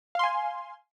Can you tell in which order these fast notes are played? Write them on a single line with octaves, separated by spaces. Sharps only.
F5 C6 G#5